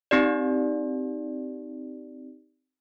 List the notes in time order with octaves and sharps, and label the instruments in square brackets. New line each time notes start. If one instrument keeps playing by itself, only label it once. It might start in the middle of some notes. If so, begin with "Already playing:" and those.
[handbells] C4 D#4 G4 D5